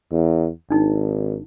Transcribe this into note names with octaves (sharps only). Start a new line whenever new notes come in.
E2
G#1 D4 D#4